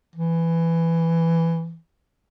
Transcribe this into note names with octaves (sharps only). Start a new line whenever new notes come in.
E3